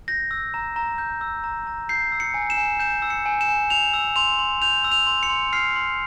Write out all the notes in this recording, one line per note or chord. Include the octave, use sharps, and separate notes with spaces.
G6 A#6
E6
A#5
A#5
G6
E6
A#5
A#5
G6 C7
E6
C#7
G#5
E7
G#5
G6 E7
E6
C#7
G#5
E7
G#5
G6 F7
E6
C6 F7
C6
G6 F7
E6
F7
C6
C#7
C6
F6 C7
C6